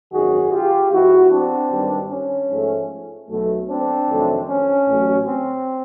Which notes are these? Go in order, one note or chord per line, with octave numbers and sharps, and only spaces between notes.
G#1 F#2 D#3 G#3 F#4 G#4
F4 G4
G#2 F3 G#3 B3 E4 F#4
C4 D4
G#1 G2 D#3 G3
C#4
G#2 F3 A3
B1 B2 F#3 A3
C4 D4
F2 C3 D#3 F#3 A3
C#4
A1 A2 F#3
C4